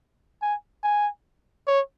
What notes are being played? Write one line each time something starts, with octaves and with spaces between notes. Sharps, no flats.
G#5
G#5
C#5